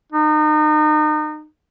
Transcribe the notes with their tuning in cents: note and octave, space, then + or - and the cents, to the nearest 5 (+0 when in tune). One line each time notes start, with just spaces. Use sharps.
D#4 -30